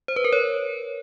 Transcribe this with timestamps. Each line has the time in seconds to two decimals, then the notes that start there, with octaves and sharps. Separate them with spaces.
0.08 C5
0.16 B4
0.24 A#4
0.33 C#5